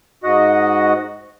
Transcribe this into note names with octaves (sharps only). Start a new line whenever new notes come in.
G#2 F#4 D#5 F#5